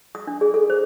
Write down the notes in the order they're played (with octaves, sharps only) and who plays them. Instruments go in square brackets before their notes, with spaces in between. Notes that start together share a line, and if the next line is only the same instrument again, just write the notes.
[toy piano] D#6
D4
G#4
A4
C5